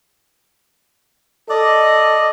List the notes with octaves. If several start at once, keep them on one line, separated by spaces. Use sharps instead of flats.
A4 D5 D#5